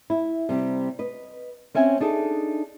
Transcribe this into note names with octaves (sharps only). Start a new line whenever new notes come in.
E4
C3 G3 C4
B4 D#5
C4 C#4 E5 G#5
D4 D#4 G#4 A4